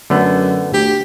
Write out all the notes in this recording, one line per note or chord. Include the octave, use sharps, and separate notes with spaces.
F#2 D3 A3 B3
D2 G4